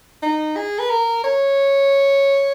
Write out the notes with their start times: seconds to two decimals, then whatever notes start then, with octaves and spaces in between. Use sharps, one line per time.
0.22 D#4
0.56 G#4
0.79 B4
0.90 A#4
1.24 C#5